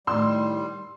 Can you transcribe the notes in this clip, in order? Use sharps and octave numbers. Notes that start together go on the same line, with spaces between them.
A2 D#3 G3 C6 E6